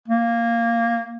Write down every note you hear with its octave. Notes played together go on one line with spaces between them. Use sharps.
A#3